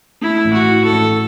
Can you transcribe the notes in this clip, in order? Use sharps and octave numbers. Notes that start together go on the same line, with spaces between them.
A3 E4
A1
F#4
E4
A4
A1